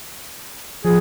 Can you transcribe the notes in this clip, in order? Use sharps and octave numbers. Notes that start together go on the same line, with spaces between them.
F3 G#4